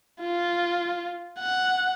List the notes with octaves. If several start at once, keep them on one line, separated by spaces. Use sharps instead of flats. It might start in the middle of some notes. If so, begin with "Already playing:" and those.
F4
F#5